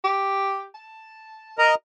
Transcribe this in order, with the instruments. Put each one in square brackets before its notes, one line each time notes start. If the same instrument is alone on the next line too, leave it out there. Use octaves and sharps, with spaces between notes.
[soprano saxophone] G4
A5
[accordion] A#4 D#5 A#5